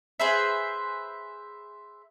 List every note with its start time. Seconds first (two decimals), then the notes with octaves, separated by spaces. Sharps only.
0.20 G#4 B4 C5 E5